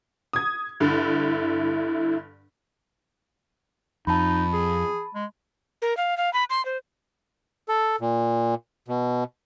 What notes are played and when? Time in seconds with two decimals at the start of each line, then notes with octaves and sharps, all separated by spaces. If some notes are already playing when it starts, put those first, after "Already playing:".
0.33 D#6 G#6
0.80 G2 D3 E4
4.07 F2 D#4 A5 B5
4.53 G#4
5.15 G#3
5.82 A#4
5.97 F5
6.17 F5
6.33 B5
6.50 C6
6.65 C5
7.68 A4
8.01 A#2
8.88 B2